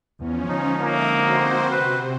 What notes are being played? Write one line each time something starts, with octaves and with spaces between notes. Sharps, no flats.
E2 F3 C#4
D3 G#3 D#4
A#3 E5 D6 D#6
C4 F#4 C5
C3 B4